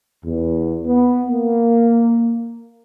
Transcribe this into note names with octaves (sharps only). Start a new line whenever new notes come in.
E2
B3
A#3